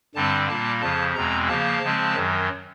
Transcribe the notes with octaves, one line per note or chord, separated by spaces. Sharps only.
G2 D3 G3 C4 A5
A#2 G3 A#3 A5
F2 C#3 F3 A5
E2 B2 G#3 C4 A#5
C#3 F3 A#3 A5
C#3 F3 G#3 C4
F#2 D#3 F#3